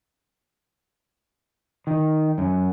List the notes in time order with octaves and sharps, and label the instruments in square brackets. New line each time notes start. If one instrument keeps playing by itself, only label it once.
[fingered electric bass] D#3
F#2